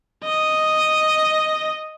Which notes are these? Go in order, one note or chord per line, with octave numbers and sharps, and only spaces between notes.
D#5